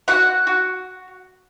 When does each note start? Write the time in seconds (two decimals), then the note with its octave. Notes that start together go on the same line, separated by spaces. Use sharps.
0.08 F#4 F#5
0.47 F#4